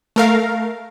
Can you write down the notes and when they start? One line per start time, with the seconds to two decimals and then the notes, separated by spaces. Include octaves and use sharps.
0.16 A3 A#4 F5